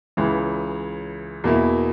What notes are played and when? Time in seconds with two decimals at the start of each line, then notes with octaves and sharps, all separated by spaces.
0.17 C#2 C#3 E3
1.44 E2 B2 A#3 E4